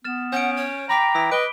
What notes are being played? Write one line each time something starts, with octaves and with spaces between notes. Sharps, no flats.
B3 F6 A6 E7
C#4 F#5 G6 D7
C#5
G5 A#5 B5 D6 B6
E3 D#6 B6
B4 D#5 D7 G7